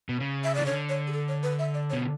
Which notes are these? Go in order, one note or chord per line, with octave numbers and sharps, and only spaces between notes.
B2
C#3
E5
E3 D5
D3 C#5
C#5
G#4
A4
C#5
B4
E5
D5
C#5
B2